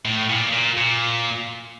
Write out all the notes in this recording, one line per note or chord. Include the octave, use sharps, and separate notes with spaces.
A2
A#2
A#2
A#2